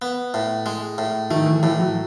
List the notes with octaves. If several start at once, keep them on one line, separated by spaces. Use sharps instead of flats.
B3
A2
G#3
A2
D#3 A3
E3
A2 E3
E3
F#3